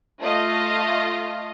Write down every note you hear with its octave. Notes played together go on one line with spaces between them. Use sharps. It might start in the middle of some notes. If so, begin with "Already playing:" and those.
A3 F4 D#5 F5